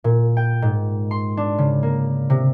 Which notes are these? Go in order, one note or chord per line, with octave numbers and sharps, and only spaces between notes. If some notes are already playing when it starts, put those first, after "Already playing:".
A#2
G5
G#2
C6
D4
C#3
A#3
C3